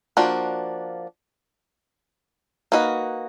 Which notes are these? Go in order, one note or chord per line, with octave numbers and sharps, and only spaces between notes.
F3 A#3 D4 F#4
A#3 D#4 F#4 B4